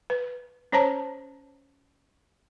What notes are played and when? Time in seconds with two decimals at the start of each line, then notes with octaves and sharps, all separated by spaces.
0.10 B4
0.72 C#4 C5 C#5 A5 A#5